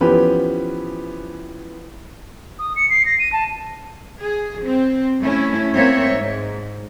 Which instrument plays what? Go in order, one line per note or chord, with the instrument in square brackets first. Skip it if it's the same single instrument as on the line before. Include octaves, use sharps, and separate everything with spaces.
[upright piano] E3 F3 B3 C#4 G4 B4
[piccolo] D#6
C#7
C7
A#6
D#7
A5
[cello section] G#4
C4
A3 C#4 E4
A#3 C4 C#5 E5
G#2